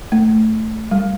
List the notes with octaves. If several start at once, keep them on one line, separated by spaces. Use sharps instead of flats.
A3
G3